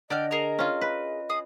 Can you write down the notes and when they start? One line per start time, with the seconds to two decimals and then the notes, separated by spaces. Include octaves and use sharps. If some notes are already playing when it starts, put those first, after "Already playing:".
0.10 D3 D5 D#5 G5 F6
0.31 G#4 A#4 A#5
0.59 C#4 F4
0.81 B4
1.29 G#4 D#6